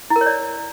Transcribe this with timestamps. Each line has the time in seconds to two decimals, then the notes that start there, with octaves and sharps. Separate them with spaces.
0.10 E4
0.16 A#4
0.21 C#5
0.26 D5